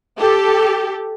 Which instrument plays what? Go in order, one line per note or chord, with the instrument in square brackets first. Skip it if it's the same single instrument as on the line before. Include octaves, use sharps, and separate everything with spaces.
[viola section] G4 A4